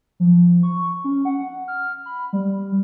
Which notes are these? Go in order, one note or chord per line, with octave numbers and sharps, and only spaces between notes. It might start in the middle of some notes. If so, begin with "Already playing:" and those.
F3
C#6
C#4
F#5
F6
B5
G3